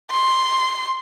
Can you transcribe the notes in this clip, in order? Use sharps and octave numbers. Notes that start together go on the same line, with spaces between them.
C6